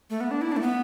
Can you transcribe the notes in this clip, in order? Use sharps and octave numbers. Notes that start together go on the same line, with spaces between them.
A3
B3
D4
E4
D4
A3
B3